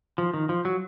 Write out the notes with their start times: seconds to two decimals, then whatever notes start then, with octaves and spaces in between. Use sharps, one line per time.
0.18 F3
0.34 D#3
0.49 F3
0.65 F#3